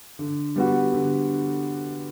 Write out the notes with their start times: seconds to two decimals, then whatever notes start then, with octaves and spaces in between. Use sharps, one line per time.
0.19 D3
0.56 G3 B3 F#4
0.93 D3